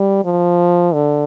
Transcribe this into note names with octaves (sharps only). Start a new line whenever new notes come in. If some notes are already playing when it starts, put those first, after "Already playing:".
Already playing: G3
F3
D3